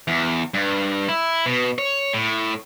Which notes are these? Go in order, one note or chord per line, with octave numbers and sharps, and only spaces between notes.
E2
G2
E4
B2
C#5
A2